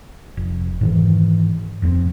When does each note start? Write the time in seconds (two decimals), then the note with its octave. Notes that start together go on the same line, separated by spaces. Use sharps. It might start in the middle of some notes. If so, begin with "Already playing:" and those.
0.37 F1
0.81 G#2 D#3 E3
1.82 F1 F2 B2 C4